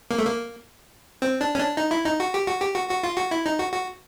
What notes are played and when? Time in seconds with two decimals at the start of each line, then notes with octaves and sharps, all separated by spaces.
0.11 A#3
0.18 A3
0.26 A#3
1.22 C4
1.41 D4
1.55 C#4
1.59 D4
1.77 D#4
1.91 E4
2.05 D#4
2.20 F#4
2.34 G4
2.47 F#4
2.61 G4
2.75 F#4
2.89 F#4
3.04 F4
3.17 F#4
3.31 E4
3.46 D#4
3.59 F#4
3.72 F#4